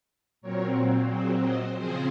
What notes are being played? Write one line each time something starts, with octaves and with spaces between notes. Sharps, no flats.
A#2 F#3 C4 A#4 C#5
G#4 C5
C5 D#5
C#3 F3 C4 G#4 C5